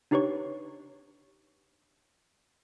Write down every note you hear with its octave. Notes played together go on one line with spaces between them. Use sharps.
D4 D#4 G4 B4 C#5 C#6